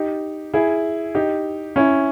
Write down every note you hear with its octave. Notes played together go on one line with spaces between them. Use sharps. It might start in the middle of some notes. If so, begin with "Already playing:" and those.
Already playing: D#4 G4
E4 G#4
D#4 G4
C#4 E4